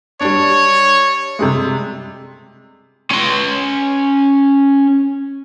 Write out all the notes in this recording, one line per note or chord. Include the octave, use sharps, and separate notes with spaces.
G3 D4 C#5
C3 G3 G#3
C#4 C6